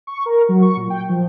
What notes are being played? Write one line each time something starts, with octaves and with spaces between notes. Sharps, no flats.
C#6
A#4
F#3
C#6
A#2
G5
F3